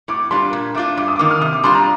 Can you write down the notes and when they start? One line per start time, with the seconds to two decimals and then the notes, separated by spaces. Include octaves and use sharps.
0.08 A2 D6
0.31 G3 D4 F4 C6
0.53 A#2
0.75 A3 D4 F4 D6
0.97 G2 D6
1.08 D#6
1.16 D6
1.19 D#3 A#3 D#6
1.31 F6
1.41 C3 D#6
1.53 D6
1.64 G3 D4 F4 C6
1.75 A#5